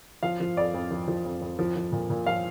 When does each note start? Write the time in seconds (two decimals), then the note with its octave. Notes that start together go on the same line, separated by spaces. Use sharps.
0.23 F3 F5
0.40 F3
0.57 F2 D5
0.74 F2
0.91 F3
1.08 F3
1.25 F2
1.41 F2
1.59 F3
1.76 F3
1.92 A#2
2.10 A#2
2.26 F3 F5